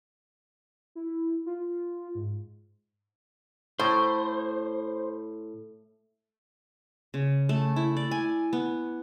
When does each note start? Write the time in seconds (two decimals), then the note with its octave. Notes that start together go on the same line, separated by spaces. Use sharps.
0.95 E4
1.46 F4
2.15 G#2
3.79 A2 C5
7.14 C#3
7.49 A3
7.76 E4
7.97 D5
8.11 G#5
8.53 B3